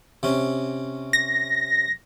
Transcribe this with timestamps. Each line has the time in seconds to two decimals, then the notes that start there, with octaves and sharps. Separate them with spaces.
0.23 C3 C#4
1.13 A#6